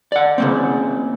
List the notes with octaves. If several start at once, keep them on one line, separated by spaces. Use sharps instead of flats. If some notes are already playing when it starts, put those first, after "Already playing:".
D5 F#5
C#3 A#3 C4